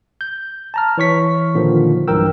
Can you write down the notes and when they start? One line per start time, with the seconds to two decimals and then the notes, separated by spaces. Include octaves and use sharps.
0.21 G6
0.74 A5 A#5 F6
0.98 E3 C#5 C#6 B6
1.55 A#2 D3 D#3 F3
2.08 B1 G2 E3 A#4 G5 E6